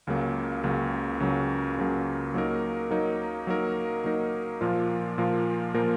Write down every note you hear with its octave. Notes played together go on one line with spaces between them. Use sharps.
C#2 C#3 F#3 A#3
C#2 C#3 F#3 A#3
C#2 C#3 F#3 A#3
C#2 C#3 F#3 A#3
F#3 A#3 D#4 A#4
F#3 A#3 D#4 A#4
F#3 A#3 D#4 A#4
F#3 A#3 D#4 A#4
A#2 F3 A#3 F4 A#4
A#2 F3 A#3 F4 A#4
A#2 F3 A#3 F4 A#4